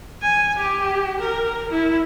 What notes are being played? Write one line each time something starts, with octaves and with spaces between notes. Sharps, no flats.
G#5
G4
A#4
E4